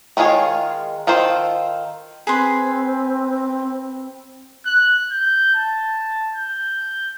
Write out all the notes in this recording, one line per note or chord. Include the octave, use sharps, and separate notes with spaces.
D#3 G#3 F4 G#4 C#5
D#3 F4 A4 C5
C4 G#4 B4 C6
F#6
G6
A5
G6